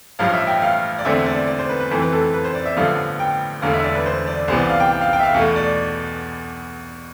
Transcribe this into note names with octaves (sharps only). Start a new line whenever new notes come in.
A1 G2 F3 F5
E5
G5
F5
D5
E1 E2 D3 A3 C4 E5
D5
D5
C5
B4
B4
F2 E3 A3 C4 C5
B4
A4
B4
B4
C5
D5
E5
A1 G2 D3 F3 B3 F5
G5
E1 E2 D3 A3 F5
E5
D5
B4
C5
D5
C2 C3 E3 B3 C5
D5
F5
G5
G5
F5
G5
E5
F5
E2 B2 A3 F5
D5